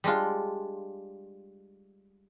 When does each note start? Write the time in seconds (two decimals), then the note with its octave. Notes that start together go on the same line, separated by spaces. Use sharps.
0.04 G3 G#3 D4 F4